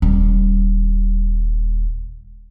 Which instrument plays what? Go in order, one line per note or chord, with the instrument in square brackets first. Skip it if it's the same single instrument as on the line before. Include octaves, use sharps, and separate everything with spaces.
[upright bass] D#1 G3